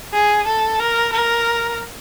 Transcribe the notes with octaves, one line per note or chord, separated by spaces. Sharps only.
G#4
A4
A#4
A#4